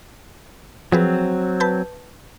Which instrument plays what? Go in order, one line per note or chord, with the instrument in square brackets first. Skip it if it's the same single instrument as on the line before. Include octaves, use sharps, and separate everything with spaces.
[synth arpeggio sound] F3 G#4 B4 [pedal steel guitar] F#3 C4
[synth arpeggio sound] B4 A5 G6